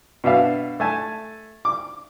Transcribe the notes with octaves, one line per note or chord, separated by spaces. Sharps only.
B2 D4 E5 F5
A3 G#5 A5
D6